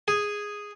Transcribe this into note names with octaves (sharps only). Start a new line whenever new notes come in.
G#4